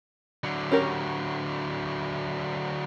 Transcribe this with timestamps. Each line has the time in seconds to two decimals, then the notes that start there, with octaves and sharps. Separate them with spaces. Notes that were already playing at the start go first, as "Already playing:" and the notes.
0.44 D3 F#3
0.72 C#4 G4 A#4